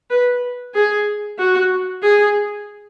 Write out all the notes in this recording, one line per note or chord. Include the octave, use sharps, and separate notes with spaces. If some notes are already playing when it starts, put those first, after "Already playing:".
B4
G#4
F#4
G#4